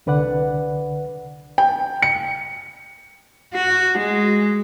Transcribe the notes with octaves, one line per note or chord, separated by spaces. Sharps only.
C2 D3 B4 D5 F#5
G5
C#7
F#4
G#3